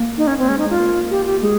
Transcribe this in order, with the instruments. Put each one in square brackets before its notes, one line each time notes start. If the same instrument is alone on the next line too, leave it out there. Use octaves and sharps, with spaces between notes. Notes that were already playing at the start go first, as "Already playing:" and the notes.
Already playing: [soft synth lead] A#3
[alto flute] D#4
C#4
C4
[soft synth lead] G#3 [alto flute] C#4
[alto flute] D#4
[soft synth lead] G#3
[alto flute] F4
[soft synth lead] A#3
[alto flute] G4
G4
[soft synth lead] G#3 [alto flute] G#4